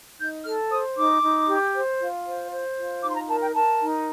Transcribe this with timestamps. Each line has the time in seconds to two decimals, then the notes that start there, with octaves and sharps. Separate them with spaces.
0.20 D#4 G6
0.45 A4 F6
0.71 C5 D#6
0.96 D#4 D6
1.23 D#4
1.48 G4
1.74 C5
2.00 F4
2.26 C5
2.51 C5
2.77 F4
3.03 D#4 D6
3.10 C6
3.16 A#5
3.28 A#4 A5
3.42 G5
3.54 A#4 A5
3.81 D#4